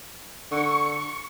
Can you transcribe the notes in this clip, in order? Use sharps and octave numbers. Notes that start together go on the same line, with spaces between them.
D3 C#6